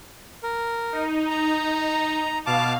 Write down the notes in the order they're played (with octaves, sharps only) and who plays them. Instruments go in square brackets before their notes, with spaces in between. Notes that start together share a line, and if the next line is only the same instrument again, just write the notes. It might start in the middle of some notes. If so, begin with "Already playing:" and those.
[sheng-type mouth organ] A#4
[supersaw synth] D#4
[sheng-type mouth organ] A#5
[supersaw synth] B2 F5 [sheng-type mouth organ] A5 D6